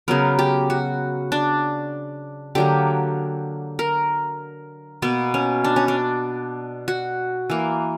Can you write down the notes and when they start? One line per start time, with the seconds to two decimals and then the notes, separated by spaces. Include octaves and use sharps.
0.08 C#3 F#3 B3 A#4
0.39 G4
0.70 F#4
1.32 D4
2.55 D3 F#3 A#3 G4
3.79 A#4
5.02 B2 A#3 B3
5.34 C#4
5.64 D4
5.76 C#4
5.88 D4
6.88 F#4
7.50 E3 A#3